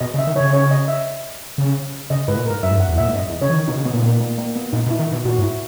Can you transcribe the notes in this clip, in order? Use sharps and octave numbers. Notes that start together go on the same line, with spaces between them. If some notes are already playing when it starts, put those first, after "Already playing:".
B2 D#5
C#3
E5
D#3
C#3 C#5
C#5
D#5
E5
C#3
C#3 D#5
G#2 B4
A#2
G#2 A#4
F#2 E5
G#2
F#2
F#5
E2
A#2 E5
G#2
F#2 D#5
E2
C#3 C#5
E3
D#3
B2 D#4
C#3
B2 B3
A#2
A#3
A#3
A#3
B3
A#2 D#4
B2
E4
D#3
B2
A#2 F#4
G#2
E4